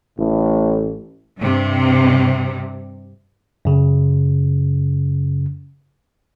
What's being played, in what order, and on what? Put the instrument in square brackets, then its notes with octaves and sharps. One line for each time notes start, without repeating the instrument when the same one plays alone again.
[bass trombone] A1 [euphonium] A2
[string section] G2 C3
[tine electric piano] F#2 C#3